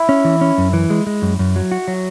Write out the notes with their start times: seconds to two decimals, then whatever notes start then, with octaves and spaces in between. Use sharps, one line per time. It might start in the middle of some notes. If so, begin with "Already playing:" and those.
Already playing: E4
0.09 C#4
0.25 E3
0.41 C#4
0.58 F#2
0.73 E3
0.90 G#3
1.07 G#3
1.22 F#2
1.39 F#2
1.56 F#3
1.72 F#4
1.88 F#3